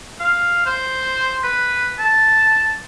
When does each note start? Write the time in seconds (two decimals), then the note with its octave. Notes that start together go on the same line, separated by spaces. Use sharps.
0.20 F5
0.66 C5
1.44 B4
1.99 A5